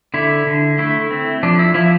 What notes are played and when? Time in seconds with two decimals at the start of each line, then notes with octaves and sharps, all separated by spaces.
0.14 D3 E4
0.47 D3
0.78 A3 E4
1.11 C4
1.43 F3 D4
1.59 E4
1.74 F3 E4